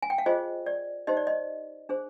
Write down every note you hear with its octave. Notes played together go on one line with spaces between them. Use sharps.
G#5
G5
F5
F4 G#4 C5 D#5
D5
D#4 G4 C5 D#5
D5
D#5
D4 G#4 C5